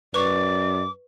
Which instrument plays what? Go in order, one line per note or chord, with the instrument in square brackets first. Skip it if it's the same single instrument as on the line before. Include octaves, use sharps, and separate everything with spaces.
[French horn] F#2 [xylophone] B4 C#6 [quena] D5 [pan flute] D6